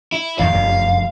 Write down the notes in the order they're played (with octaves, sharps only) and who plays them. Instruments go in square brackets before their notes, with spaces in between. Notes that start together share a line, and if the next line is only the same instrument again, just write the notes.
[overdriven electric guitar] E4
[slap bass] F2 G#2 D#3 [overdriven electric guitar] F5
[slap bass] F1 F#2 G3